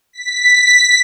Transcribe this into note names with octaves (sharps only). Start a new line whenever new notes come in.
B6